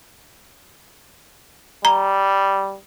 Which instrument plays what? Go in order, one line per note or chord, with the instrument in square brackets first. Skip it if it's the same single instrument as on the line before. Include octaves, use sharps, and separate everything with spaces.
[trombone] G3 [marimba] A#5